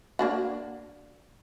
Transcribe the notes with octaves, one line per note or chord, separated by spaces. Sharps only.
A#3 D4 F#4